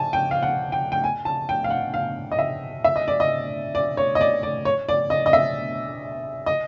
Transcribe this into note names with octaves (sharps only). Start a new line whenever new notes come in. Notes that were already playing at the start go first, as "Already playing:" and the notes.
Already playing: G#5 A5
G5
F5
F#5
G5
G5
G#5
A5
G5
F5
F#5
F5
D#5
E5
E5
D#5
D5
D#5
D5
C#5
D#5
D5
D5
C#5
D5
D#5
D#5
E5
D#5